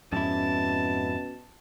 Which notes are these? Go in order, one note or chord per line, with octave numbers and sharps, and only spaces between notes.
F2 G#2 B2 C#4 E4 A5